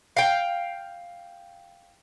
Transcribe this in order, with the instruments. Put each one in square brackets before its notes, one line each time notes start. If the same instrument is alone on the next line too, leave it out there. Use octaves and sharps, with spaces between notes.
[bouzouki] F5 G5